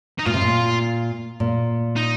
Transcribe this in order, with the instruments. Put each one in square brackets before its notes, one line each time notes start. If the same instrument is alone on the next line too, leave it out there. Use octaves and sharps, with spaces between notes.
[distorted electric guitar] D#4
[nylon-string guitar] A#2 [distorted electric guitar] F4
[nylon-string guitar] C3
A#2
A#2
[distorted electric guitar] D#4